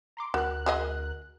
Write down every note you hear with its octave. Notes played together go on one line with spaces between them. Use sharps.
A#5 C6 D6
D2 F#4 A#4 F#6
F#4 G#4 D#5